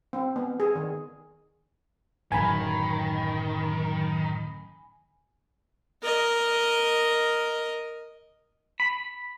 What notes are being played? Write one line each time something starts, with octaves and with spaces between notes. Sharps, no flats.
C4
B3
G#4
D#3
D1 F#2 D#3 F#3 G#5 B5
A#4 D#5
B5